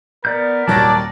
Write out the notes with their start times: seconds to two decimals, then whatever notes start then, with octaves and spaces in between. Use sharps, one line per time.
0.25 B3 A#4 D5 G6
0.68 D#1 D#2 F#3 D5 A5 A#6